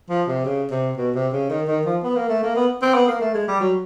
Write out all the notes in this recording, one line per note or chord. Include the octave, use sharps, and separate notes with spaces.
F3
C3
C#3
C3
B2
C3
C#3
D#3
D#3
F3
B3
A#3
A3
A#3
B3
C4
B3
A#3
A3
G#3
G3
F#3